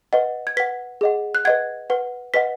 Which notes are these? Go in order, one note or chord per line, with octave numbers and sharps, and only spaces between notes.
B4 D#5 F#5
G#6
B4 F#5 B6
G#4 D#5 F#5
F#6
B4 D#5 F#5 G#6
B4 F#5
B4 D#5 F#5 B6